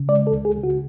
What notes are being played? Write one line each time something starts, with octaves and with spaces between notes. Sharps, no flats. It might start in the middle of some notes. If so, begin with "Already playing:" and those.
Already playing: C#3
G#3 D5
A4
C#2
G#4
C#3
F#4